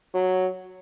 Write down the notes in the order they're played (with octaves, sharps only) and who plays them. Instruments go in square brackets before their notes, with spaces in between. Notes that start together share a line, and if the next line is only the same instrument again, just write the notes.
[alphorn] F#3